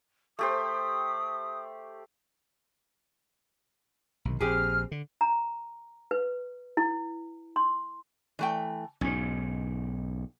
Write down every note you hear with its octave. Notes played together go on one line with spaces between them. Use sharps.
A3 G4 C5 D#6
B1 C3 D#3
A#1 C4 G4 G#4 F6
D3
A#5
B4
E4
C6
E3 A3 G5
B1 G#2 C#4